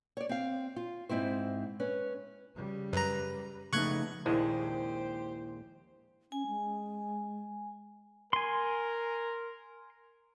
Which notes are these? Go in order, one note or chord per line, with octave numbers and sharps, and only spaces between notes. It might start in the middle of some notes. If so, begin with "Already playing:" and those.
C#5 D5
C4 F5
F4
G#2 C4 E4 C5
C#4 B4 C#5
C#3 G3
F#2 B4 A#5
C#3 F3 A3 B3 D#4 C#6 F#6 G#6
A#1 D#2 G#3 E4 G4 C5
C#4 G#5
G#3
A#4 G#5 C6